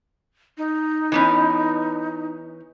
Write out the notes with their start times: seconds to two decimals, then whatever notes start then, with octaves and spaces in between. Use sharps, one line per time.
0.58 D#4
1.12 E3 B3 C#4